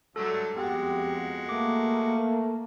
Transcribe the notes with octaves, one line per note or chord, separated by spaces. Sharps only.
G#2 D3 F#3 G3 A3 A4
F2 G#3 B3 F#4 G4
A3 A#3 D6